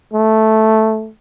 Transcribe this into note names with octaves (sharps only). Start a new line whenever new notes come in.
A3